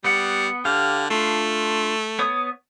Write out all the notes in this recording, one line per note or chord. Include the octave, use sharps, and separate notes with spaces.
G3 B3 F#5
D3 G4 F5
A3 D4 F4
B3 C#5 D#6